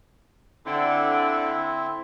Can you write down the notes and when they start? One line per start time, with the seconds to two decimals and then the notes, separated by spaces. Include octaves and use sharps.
0.66 D3 C4 E4